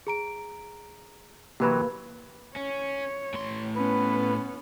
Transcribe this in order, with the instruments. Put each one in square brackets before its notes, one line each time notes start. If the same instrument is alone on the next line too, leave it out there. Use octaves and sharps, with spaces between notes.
[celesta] G#4 A#5 D7
[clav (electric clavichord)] C3 E3 F#3 [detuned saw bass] A#3 [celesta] G4 B4 B5
[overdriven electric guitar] C#4 [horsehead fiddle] C#5
[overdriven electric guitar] A2 C6
[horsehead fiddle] B3 C#4 [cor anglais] B4